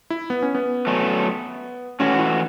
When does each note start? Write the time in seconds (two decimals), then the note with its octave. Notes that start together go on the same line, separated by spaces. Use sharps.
0.10 E4
0.30 B3
0.42 C#4
0.55 B3
0.87 F#3 A3 C#4
2.00 E3 A3 C#4 F#4
2.19 E4